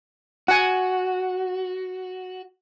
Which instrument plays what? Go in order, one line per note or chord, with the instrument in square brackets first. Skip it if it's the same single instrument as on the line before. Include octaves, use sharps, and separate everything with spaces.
[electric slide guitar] F#4 [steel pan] F#5 G#5